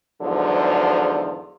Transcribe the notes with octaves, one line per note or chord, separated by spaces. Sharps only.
E2 G#2 D3 F3 F#3